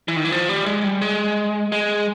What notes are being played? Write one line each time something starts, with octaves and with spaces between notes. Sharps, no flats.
E3
D#3
E3
F3
G3
G#3
G3
G#3
G#3